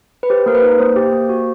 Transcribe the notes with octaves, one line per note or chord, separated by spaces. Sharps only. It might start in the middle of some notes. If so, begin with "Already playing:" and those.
B4
G4 C5
A#3 A#4
B4
D#4
A#3 C5
G4
A#3
F#4